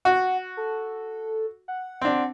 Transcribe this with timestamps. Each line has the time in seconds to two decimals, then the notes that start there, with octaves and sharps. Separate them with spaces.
0.05 F#4 F#5
0.57 A4
1.68 F#5
2.02 C4 D4